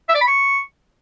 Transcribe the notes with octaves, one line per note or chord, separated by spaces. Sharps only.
E5
D5
B5
C#6